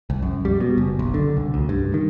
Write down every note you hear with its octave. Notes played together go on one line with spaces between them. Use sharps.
C2
F#2
G3
B2
F#1
B1
D3
C2
D2
G2
D#3